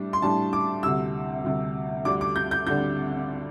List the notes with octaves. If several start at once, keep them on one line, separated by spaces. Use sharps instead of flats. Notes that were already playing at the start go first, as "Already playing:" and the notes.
Already playing: A2 G3 D4
C6
A2 G3 D4 A5
D6
D2 C3 G3 E6
D2 C3 G3
D2 D3 G3 D4 D6
D6
G6
G6
D2 D3 G3 D4 G6